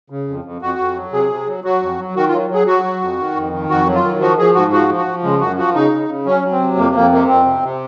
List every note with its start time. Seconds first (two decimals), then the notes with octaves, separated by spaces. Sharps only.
0.10 C#3
0.28 F2
0.45 F2
0.62 F2 F#4
0.79 F2
0.96 F#3
1.12 C3 G#4
1.30 C3
1.47 F#3
1.64 F#3 F#4
1.82 F2
1.99 F#3
2.16 D#3 F#4
2.28 F4
2.33 F#3
2.50 F#3 G#4
2.67 F#3 F#4
2.84 F#3
3.01 F2
3.19 D#3
3.36 F2
3.53 D#3
3.69 F2 F#4
3.87 F#3
3.95 F4
4.04 D#3
4.21 F3 F#4
4.38 F3 G#4
4.54 G#2 F#4
4.72 F3 F#4
4.90 F3
4.98 F#4
5.06 F3
5.23 C#3 G#3
5.40 F#2 F#4
5.58 F3 F#4
5.74 C#3 D#4
5.92 C#3
6.09 C#3
6.26 F#3 C#4
6.44 F#3
6.52 C4
6.60 C3
6.77 F2 A#3
6.95 F2 A#3
7.12 C3 A#3
7.28 F2 C4
7.46 C3
7.63 C3